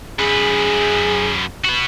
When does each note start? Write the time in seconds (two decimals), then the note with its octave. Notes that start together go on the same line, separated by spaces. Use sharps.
0.19 F#2 G#4 B4
1.64 F#4 B4